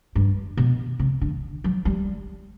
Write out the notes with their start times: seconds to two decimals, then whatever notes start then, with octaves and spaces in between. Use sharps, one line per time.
0.15 G2
0.57 B2
0.99 C3
1.21 D3
1.64 F#3
1.85 G3